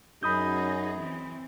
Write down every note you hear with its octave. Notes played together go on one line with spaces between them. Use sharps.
F#2 D#4 G#4 B5 D#6 G6
E3 C4